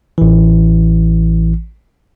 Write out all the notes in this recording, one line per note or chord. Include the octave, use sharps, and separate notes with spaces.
A1 E3